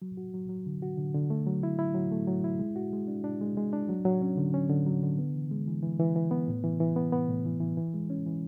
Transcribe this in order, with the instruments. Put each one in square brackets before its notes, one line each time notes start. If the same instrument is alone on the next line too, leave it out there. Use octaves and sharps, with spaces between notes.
[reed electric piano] F#3
F#4
F#3
F#3
D3
F#4
D3
D3
A3
F#3
E4
E4
F#3
A3
F#3
E4
G#3
F#4
G#3
D4
D4
G#3
G#3
D4
F#3
F#3
C#4
D3
C#4
D3
F#3
D3
B3
E3
G#3
E3
E3
E3
E3
B3
A2
E3
E3
B3
B3
A2
E3
E3
E3
G#3
C#4
E3